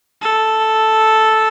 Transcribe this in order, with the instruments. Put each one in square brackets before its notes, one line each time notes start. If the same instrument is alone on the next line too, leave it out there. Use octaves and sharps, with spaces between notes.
[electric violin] A4